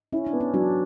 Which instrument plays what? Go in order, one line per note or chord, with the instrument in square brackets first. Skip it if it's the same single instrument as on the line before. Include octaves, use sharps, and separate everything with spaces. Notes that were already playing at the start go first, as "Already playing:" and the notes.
[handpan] C#4 [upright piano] E4
[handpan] D4
[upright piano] B3
[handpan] C#4
[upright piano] F#3 [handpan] D4